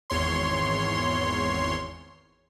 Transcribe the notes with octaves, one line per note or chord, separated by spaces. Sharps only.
G#1 E2 C#5 C6